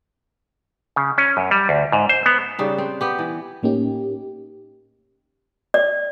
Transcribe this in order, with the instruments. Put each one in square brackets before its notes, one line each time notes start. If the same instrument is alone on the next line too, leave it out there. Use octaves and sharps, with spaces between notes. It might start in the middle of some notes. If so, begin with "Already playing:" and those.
[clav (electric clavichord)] C#3
C#4
F#2
G3
D2
G#2
C5
B3
[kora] C#3 G3 D#4
C4
B3 G4
E3
[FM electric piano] A2 A#3 C#4 D#4 G4
[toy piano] D5